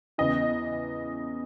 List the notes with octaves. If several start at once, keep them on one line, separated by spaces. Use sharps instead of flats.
E2 C#3 E3 D#5